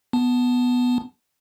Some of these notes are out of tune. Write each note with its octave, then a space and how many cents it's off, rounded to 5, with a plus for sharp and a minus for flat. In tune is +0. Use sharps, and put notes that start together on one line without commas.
B3 +0 A5 +0